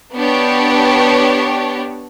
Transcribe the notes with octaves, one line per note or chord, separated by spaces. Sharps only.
B3 D4 G4 C#5